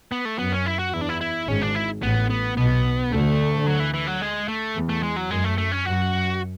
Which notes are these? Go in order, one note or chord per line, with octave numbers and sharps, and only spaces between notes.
B3
A3
F#2 B3
C#4
E4
F#4
E2 E4
D4
E4
E4
G#1 G#2 C#4
D4
E4
A1 A2 B3
B3
B1 B2 B3
D2 D3 A3
F#3
E3
E3
F#3
G#3
A3
E2
A3
G#3
F#3
F#2 G#3
A3
A3
C#4
F#2 F#4